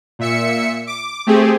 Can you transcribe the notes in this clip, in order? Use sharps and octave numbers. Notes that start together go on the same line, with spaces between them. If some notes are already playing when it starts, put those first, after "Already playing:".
A#2 E5 C#7
D6
A3 C4 G4 G#4